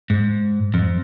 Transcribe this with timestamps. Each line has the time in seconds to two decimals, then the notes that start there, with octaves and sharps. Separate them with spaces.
0.10 G#2
0.74 F2